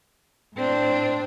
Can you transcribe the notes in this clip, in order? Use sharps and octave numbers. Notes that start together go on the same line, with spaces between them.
A2 C4 D4